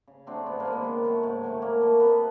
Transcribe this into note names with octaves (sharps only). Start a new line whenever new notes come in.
C#3
F#3 A3 C4 D4
G#2 B3
A#3 C4
D#3 G#3
B3
C#3
F#3 A3
G#2
D#3 F#3 A3
A#2 A#3
F#3 A3 B3
C3 B3